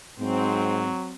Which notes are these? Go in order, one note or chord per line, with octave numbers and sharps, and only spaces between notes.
G#2 F#3 C4